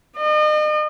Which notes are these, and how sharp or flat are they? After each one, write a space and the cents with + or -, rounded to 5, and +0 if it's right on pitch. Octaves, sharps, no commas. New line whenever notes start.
D#5 -40